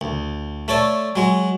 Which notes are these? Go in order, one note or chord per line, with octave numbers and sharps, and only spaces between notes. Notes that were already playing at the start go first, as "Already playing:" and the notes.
D2
A3 A4 C#5 D5
F#3 G#3